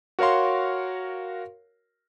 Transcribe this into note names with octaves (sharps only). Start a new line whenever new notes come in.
F#4 A#4 C#5 F5 C6